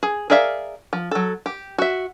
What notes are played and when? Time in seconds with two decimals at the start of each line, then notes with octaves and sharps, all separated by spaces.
0.03 G#4
0.30 G#4 A#4 D5 E5 F5
0.93 F3
1.11 F#3 A4
1.46 G4
1.78 F#4 E5